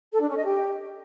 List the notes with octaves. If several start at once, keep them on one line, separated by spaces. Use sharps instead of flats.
A4
D4
C#4
D#5
G4